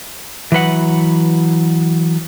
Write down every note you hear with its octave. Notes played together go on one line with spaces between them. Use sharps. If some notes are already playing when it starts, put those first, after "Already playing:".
E3 F#3 B4 F#5